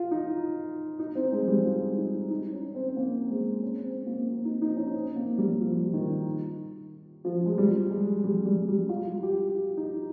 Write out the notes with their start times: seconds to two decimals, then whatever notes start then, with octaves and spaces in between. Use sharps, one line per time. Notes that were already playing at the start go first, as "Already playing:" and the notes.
Already playing: F4
0.11 D#4
0.99 D#4
1.15 C4
1.32 G#3
1.48 G3
1.65 F4
1.97 D#4
2.31 D#4
2.52 C#4
2.75 C4
2.89 C4
2.96 A#3
3.30 G#3
3.63 C#4
3.84 C4
4.06 A#3
4.28 C4
4.45 D#4
4.62 D#4
4.77 C#4
4.94 C4
5.16 A#3
5.38 G3
5.60 F3
5.93 D#3
7.25 F3
7.46 G#3
7.58 G3
7.91 G#3
8.24 G3
8.46 G3
8.68 G3
8.89 F4
9.23 G4
9.55 F4
9.77 D#4